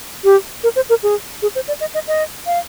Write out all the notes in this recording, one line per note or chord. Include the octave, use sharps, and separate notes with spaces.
G4
A#4
C5
A#4
G#4
G#4
C5
D5
D#5
D#5
D#5
F5